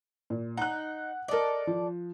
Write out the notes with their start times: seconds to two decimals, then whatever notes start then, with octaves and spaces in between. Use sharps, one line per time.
0.30 A#2
0.57 D#4 F#5 F#6
1.28 A4 A#4 D5 D#5
1.67 F3